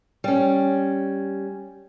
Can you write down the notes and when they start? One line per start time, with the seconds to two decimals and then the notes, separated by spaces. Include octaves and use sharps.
0.24 G3 C#4